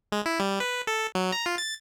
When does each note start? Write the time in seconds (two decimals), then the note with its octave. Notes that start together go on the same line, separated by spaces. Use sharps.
0.12 G#3
0.26 E4
0.40 G3
0.60 B4
0.87 A4
1.15 F#3
1.32 A#5
1.46 F4
1.58 A6